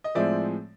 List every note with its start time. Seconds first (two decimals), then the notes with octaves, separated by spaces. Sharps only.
0.04 D#5
0.15 A2 F3 G#3 C4 D5 E5